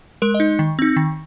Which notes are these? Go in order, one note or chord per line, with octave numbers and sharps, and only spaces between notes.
G#3 A#4
D#5
D#4
D#3
C4 D#4
D#3